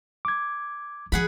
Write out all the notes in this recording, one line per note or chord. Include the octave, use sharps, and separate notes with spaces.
D6 G#6
F3 G#4 F#5 B5